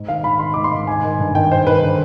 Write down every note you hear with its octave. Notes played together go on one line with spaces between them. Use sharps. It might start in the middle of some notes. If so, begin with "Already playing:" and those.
Already playing: G#2
D#3 F5
D#3 B5
D#3 C6
G#2 D6
C6
G#2
D#3 G#5
D#3
G2
D#3 G5
D#3 C5
D#3 B4
D3